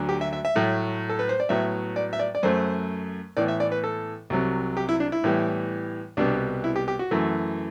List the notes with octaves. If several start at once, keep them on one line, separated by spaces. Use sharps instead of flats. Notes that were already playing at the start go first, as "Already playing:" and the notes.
Already playing: D2 D3 F#3
G4
E5
E5
E5
A2 F#3 A3
A4
B4
C5
D5
A2 F#3 B3 E5
D5
E5
D5
D5
F#2 F#3 A3 C5
A2 E3 B3 D5
E5
D5
B4
A4
C2 C3 F#3
G4
E4
D4
E4
A2 E3 G3 B3
C2 B2 G3 B3 D4
E4
G4
G4
F#4
F#2 E3 A3